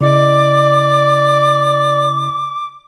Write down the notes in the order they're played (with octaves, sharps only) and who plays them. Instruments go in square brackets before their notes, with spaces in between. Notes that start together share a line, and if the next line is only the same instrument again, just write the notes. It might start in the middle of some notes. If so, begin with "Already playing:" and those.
[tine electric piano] C#3 E4 D#5 [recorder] D5 [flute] D6